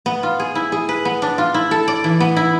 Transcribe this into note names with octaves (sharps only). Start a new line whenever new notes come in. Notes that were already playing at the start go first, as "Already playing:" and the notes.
B3
F4
G#4
E4
G#4
B4
B3
D4
F4
E4
A4
D5
E3
B3
E4